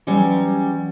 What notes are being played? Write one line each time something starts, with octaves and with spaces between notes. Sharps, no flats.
E3 F#3 G3 C#4